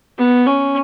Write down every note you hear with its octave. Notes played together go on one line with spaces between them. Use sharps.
B3
C#4